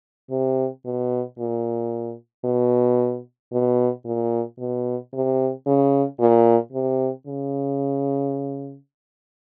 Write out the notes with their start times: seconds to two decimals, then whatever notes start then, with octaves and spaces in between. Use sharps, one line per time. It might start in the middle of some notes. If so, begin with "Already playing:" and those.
0.30 C3
0.85 B2
1.38 A#2
2.44 B2
3.52 B2
4.05 A#2
4.59 B2
5.13 C3
5.66 C#3
6.20 A#2
6.72 C3
7.27 C#3